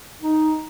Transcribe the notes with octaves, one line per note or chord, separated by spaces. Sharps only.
D#4